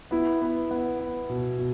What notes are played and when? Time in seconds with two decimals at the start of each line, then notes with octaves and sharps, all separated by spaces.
0.11 B3 E4
0.42 B3
0.71 B3
1.00 B3
1.30 B2
1.59 B2